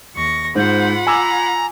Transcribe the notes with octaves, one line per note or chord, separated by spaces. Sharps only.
D#2 C#6 A#6
G#2 F4 C5 F#5 B5
G#5 A#5 D6 E6